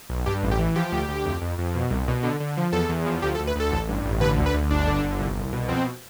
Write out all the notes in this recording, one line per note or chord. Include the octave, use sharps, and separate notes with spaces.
B1
G2 G4
A1
G4
E3
F3 G4
D2
D2
F2
F2
F2
B2
C2
B2
D3
D3
F3
E2 A4
E2
F3
D2 G4
A4
D2
B4
D2 A4
A1
G2
A1
D3 B4
D2
B4
D2
G1 D4
D3
G1
C2
C2
B2
F2 C4